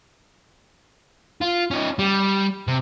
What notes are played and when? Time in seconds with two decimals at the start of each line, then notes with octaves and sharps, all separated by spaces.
1.41 F4
1.71 C#4 D#4
1.99 G3
2.67 C3